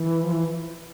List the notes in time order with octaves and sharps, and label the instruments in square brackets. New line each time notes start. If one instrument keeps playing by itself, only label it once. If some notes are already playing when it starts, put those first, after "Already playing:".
Already playing: [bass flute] E3
F3
E3